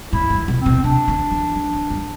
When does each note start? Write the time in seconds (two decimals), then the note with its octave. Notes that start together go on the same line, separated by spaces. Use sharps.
0.13 A2 E4
0.30 G2
0.48 B2
0.60 C4
0.66 B2
0.84 C3 D4
1.08 D3
1.31 E3
1.55 F3
1.73 F3
1.90 G2